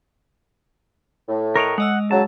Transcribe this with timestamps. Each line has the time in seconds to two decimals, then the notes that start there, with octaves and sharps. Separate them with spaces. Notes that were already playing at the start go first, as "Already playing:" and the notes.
1.29 A2
1.56 A#4 C#5 D#5 F#6 D7 F7
1.78 G#3 D#5 F#5 E6
2.11 C#3 F#3 A5